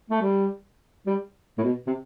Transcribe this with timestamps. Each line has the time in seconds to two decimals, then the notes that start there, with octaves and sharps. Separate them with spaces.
0.10 A3
0.21 G3
1.06 G3
1.58 A2
1.63 B2
1.87 C3